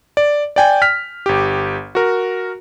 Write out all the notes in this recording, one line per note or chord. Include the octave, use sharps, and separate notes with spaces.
D5
D5 G5 G#5
F6 B6
G1 G4
F#4 A#4